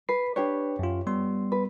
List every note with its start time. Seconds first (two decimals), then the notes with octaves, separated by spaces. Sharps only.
0.09 B4 C7
0.36 D4 G4 B4 C#5
0.79 F#2 F4
1.07 G3 B3 C6
1.52 B4